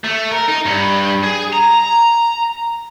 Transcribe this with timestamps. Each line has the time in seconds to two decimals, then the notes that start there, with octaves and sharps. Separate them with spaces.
0.04 A3
0.31 A#4
0.48 D#4
0.66 G2
1.23 G#4
1.53 A#5